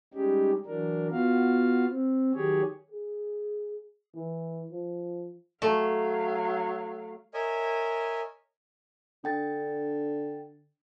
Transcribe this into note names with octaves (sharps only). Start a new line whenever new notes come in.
G3 G#3 C#4 D#4 G4
E3 F#3 D4 A#4
B3 F4 F#4 F5
C4
D#3 F#3 G4 G#4 C#5
G#4
E3
F3
F#3 A3 F5
A#4 C#5 D#5 E5 G#5
D3 D4 G5 A6